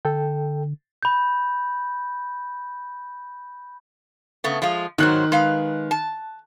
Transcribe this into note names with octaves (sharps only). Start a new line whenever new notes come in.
D3 A4 G5
B5 G6
C#3 A3 B3
F3 G#3 F4
G#2 D#3 F#3 C5 F#6
G#3 B4 F5
A5